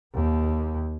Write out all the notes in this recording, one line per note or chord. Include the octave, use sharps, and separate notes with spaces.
D#2